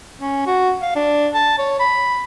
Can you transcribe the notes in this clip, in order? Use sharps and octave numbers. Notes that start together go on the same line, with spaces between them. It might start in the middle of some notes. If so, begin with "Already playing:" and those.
C#4
F#4
F5
D4
A5
C#5
B5